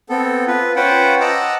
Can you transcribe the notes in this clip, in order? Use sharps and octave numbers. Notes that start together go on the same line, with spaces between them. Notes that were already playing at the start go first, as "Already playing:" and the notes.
B3 C4 A4
F4 B4
C#4 F4 B4 C5 F#5 G5
D#5 F#5 A5 A#5 D6 E6